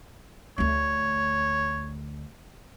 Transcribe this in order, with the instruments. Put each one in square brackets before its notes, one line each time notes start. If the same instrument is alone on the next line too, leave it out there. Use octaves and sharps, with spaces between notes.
[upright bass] D2 A3 [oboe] C#5